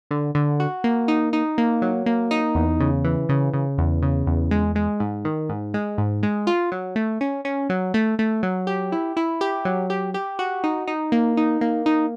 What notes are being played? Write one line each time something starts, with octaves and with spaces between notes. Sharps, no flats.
D3
D3
F#4
A#3
D#4
D#4
A#3
F#3
A#3
D#4
E2
C#3
E3
C#3
C#3
E2
C#3
E2
G#3
G#3
G#2
D#3
G#2
G#3
G#2
G#3
F4
F#3
A3
C#4
C#4
F#3
A3
A3
F#3
G4
E4
E4
G4
F#3
G4
G4
F#4
D#4
D#4
A#3
D#4
A#3
D#4